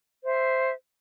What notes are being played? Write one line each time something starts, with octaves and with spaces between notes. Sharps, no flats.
C5 E5